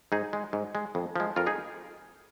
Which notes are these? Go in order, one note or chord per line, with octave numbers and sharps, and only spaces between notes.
G#2 D#4 G#4
G#3
G#2
G#3
F2
F3 G#3
F2 F4 A#4
D#4 G#4